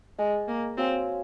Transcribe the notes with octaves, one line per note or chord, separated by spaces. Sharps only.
G#3 G#4 D#5 G#5
A#3
C4 F#4 C#5 F5 G#5